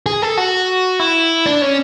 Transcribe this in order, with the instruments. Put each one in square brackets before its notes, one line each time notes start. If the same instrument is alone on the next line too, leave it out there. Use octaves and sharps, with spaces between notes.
[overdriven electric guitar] G#4
A4
F#4
E4
D4
C#4